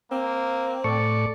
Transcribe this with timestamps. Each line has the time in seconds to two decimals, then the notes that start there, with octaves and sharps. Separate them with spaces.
0.11 A#3 C4
0.84 A2 A4 D5 C#6